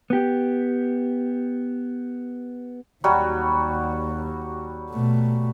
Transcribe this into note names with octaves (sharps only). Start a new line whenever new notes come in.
B3 G4
D#2 F#3 G3 F#4
B2 A3